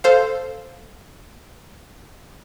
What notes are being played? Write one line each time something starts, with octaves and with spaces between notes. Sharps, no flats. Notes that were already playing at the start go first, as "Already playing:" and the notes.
A4 C5 F5